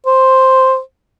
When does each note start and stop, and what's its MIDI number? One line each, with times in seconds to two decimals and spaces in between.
0.06 0.79 72